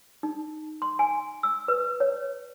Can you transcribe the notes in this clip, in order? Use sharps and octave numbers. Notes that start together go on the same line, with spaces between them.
D#4
C6
G#5
E6
B4
C#5